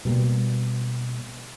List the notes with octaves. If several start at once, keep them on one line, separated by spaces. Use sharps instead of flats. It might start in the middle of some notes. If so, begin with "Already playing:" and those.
B2 G3 A#3